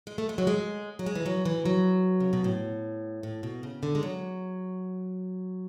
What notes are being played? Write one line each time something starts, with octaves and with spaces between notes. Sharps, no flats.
G#3
A3
G#3
F#3
G#3
F#3
G#3
E3
F#3
E3
F#3
C#3
B2
A2
A2
B2
C#3
D3
G#3
F#3